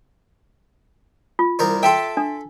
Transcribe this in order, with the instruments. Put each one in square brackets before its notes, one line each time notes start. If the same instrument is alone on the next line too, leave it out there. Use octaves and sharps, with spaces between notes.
[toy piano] F4
[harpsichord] C2 A#4 C5
[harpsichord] A4 E5 [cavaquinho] G5 A5 C6
[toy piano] D4